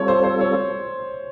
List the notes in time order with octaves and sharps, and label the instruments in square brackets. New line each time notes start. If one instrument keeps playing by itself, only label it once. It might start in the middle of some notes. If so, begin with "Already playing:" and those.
Already playing: [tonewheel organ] G3 C4 F4 A4 [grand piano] C#5
[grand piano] C5
C5
C#5